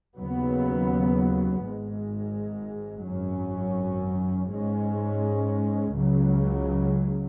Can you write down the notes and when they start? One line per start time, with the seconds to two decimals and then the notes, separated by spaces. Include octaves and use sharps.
0.18 D#2 C#3 F#3 B3
1.62 G#1 G#2 G#3
3.06 G#1 F#2 F#3 C#4
4.50 G#2 G#3 C#4
5.94 C#2 C#3 F#3